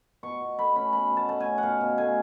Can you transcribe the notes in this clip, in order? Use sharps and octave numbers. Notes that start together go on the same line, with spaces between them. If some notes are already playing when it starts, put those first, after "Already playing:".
B2 C#6
B2
A3 B5
C#4 B5
B2 B5
B2
A5
A3 A5
G#5
C#4
F#5
B2 F5
B2
A3 G#5